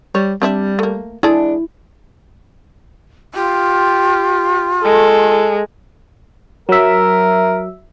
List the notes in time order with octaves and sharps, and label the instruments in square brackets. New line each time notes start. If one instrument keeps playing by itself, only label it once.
[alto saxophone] G3 [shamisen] C#5
[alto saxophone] G3 [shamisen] C4 D4 E5
[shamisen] A3 A#3
[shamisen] G#3 G#4 A4 [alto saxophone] D4 [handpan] E4
[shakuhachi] F4 [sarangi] G4
[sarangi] G#3 [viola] A4
[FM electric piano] F#3 E5 [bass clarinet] A#4